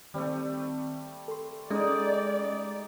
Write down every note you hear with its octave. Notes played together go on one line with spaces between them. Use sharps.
D#3 G3 A3 C4
A4 C6
G#3 C#4 D#4 A4 D5 D#5